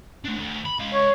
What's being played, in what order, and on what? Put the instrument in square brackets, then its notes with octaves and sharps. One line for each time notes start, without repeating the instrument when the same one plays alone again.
[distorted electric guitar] A3 D4
D2
B5
G#3 F5
[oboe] C#5